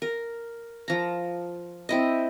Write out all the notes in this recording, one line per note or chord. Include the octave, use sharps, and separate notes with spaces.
A#4
F3 A#5
C4 E4 D#5